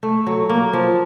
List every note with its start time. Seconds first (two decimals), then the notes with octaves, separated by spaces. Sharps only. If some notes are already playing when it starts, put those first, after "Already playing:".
0.03 A3
0.27 F#3
0.49 A#3
0.73 F3